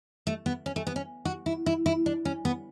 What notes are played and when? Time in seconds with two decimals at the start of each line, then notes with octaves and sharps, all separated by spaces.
0.27 A3
0.46 B3
0.66 C#4
0.76 A3
0.87 B3
0.96 C#4
1.25 F#4
1.46 E4
1.66 E4
1.86 E4
2.06 D4
2.25 C#4
2.45 B3